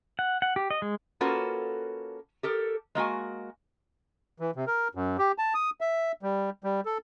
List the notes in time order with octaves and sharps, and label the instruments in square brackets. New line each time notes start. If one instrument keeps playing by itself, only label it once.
[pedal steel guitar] F#5
F#5
G4
D#5
G#3
[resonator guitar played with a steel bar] A#3 C#4 F4 F#4 A4 B4
G4 A4 A#4
G#3 A#3 F#4 G#5
[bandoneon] E3
C3
A#4
F#2
G4
A5
D#6
E5
G3
G3
A4